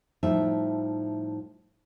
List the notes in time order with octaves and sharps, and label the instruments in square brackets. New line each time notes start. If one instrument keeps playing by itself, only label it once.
[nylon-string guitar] A2 F3 G3 D#4 E5